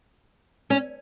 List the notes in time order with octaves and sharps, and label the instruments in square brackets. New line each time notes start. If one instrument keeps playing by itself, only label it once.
[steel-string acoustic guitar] C#4